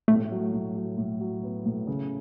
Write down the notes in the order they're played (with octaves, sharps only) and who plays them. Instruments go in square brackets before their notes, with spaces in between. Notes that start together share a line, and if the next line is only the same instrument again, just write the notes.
[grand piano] A2 [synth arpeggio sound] A3
[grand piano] F#3
A2
F#3
A2
F#3
B3
A2
C#3